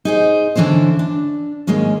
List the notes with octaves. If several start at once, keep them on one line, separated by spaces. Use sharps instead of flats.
D#4 G#4 C5
D3 E3 C#4 E4 C5
D4
D#2 G#2 G#3 A#3 C#4